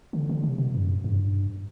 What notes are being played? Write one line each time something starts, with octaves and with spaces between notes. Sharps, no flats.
D3
D3
C3
B2
F#2
G2